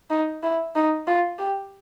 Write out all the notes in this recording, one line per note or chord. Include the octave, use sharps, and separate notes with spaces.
D#4
E4
D#4
F4
G4